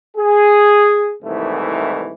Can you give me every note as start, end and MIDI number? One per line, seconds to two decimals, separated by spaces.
0.17 1.14 68
1.23 2.14 36
1.23 2.14 44
1.23 2.14 51
1.23 2.14 52
1.23 2.14 57